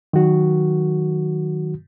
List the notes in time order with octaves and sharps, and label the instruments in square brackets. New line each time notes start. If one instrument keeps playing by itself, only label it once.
[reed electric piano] D#3 F#3 F#4